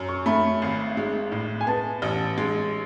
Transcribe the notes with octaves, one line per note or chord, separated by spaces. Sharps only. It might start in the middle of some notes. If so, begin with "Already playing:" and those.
Already playing: F#2
C#6
A3 B5
G#1
G#3
A2
G#5
B3 A5
A1
G#3